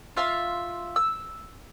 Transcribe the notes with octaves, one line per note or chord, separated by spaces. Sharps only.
F4 E5 F5 C6
E6